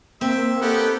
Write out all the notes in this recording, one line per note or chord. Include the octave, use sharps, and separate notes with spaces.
A#3 C4 E5
B3 D#4 G4 A4